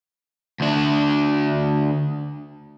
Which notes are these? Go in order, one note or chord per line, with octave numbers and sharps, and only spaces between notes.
D2 D4